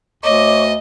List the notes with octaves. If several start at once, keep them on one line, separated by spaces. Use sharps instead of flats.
D2 C#5 D#5 C#6 D6